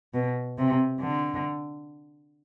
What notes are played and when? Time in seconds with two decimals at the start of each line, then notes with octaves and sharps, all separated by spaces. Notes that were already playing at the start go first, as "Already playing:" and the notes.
0.14 B2
0.58 C3
1.00 D3